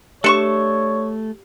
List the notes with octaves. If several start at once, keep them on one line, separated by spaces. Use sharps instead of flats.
A3 D4 G4 C#5 C6 C#6 C#7 E7